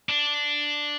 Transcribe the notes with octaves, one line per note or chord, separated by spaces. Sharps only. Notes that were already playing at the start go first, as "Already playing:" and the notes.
D4